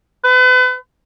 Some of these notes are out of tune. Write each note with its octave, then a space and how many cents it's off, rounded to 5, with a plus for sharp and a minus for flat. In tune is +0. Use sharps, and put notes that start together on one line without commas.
B4 +35